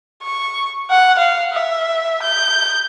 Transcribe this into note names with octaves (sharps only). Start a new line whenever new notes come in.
C#6
F#5
F5
E5
G6